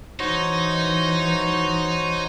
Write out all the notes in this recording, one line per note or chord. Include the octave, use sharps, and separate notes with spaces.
E3 D#4 F#4 C5 C#5